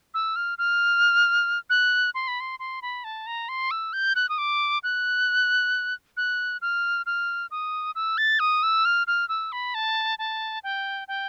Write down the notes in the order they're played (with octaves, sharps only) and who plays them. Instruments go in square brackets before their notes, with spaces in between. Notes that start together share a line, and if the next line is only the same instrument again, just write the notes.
[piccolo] E6
F6
F6
F#6
C6
B5
C6
C6
B5
A5
A#5
C6
E6
G6
F#6
D#6
D6
F#6
F#6
F6
F6
D#6
E6
A6
D#6
E6
F6
F6
E6
B5
A5
A5
G5
G5